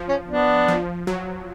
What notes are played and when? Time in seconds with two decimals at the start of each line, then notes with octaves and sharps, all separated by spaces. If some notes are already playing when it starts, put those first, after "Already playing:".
Already playing: F3
0.08 C#4
0.29 B3 D4
0.68 F3
1.07 F#3